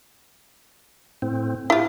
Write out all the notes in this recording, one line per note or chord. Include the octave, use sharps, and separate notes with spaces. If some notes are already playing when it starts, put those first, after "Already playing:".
A2 C4
E4 F4 G4